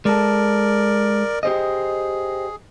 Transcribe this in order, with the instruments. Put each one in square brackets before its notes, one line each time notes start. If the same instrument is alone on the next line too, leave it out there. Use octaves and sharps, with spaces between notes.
[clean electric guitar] G#3 A4 [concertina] A#4 D5
[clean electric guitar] G4 C5 D#5 [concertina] G#4